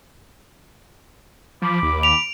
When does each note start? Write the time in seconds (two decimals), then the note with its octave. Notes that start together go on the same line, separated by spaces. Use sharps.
1.62 F3 B5 D6
1.83 D#2
2.03 D7 F7